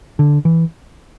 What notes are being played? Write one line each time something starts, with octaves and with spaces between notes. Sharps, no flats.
D3
E3